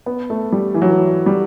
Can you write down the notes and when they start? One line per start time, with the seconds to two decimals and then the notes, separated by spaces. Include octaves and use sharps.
0.06 B3
0.30 A3
0.52 G3
0.74 E3
0.82 F#3
0.88 E3
1.26 G3